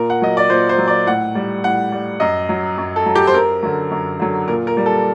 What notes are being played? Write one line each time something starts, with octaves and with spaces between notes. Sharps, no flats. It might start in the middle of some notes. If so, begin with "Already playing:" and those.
Already playing: A#2 A#4
F#5
F#3 D#5
D5
A#2 C5
C5
F#3
D5
A2 F#5
G3
A2 F#5
G3
F#2 D#5
F#3
F#2
A4
F#3
G4
C5
F#2 A#4
D3 F#3
F#2
D3 F#3
A#2 A#4
A#4
G3
A4